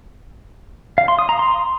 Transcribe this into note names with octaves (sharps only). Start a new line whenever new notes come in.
F5
C6
D#6
A#5
C6